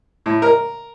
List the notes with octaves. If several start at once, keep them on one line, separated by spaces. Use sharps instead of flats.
A2
A#4